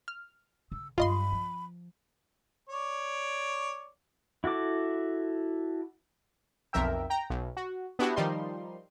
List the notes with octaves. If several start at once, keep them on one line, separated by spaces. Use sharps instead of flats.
F6
C#3 E6
G2 F#3 F4 D#5 B5 C6
F3
C#5 D5
E4 F#4 A4 D6
B1 F2 A#4 E5 G5
G5 A#5
B1
F#4
B3 D4 E4 F#4 G4
D#3 F3 G3 D#4 C6